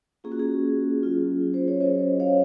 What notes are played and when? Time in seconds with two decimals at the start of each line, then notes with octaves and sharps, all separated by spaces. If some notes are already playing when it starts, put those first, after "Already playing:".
0.24 A#3 C#4 F4 G#4
0.32 F#4
0.39 G#4
1.03 F#3 C#4 F4
1.54 C5
1.68 C#5
1.80 F#3 C#4 F#4 C5 D#5
2.20 C#5 F5